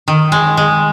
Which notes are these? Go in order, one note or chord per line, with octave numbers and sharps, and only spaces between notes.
D#3
G#3
G#3